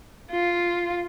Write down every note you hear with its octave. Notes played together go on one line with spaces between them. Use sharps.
F4